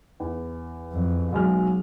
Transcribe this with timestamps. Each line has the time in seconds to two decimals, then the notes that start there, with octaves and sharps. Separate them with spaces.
0.20 E2
0.92 F2
1.32 B1 F#3 G#3 F6